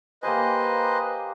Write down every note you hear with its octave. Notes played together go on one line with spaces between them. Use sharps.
A#3 G4 B4 C5 D#5 G#5